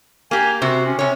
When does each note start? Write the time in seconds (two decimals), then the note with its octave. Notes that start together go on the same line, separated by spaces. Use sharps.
0.31 A#3 G4 G#5
0.62 C3 F#4 C5
0.86 C#4
0.99 C3 C#4 C#5